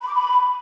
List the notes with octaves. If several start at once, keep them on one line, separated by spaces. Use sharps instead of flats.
B5
D6
B5